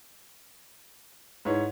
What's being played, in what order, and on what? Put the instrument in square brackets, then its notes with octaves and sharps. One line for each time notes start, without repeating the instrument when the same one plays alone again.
[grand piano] G#2 C#5 [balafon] D#4 E4 B4